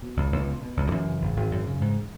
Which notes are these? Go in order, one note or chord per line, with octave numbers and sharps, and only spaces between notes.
B2
C#2
C#2
B2
B2
C#2
D3
F#2 E3
C#3
G#1
G#1
F#2
C#3
G#2